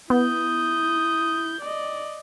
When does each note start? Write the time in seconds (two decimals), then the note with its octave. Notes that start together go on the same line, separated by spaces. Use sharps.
0.10 B3 E4 D#6 G6
1.61 D5 D#5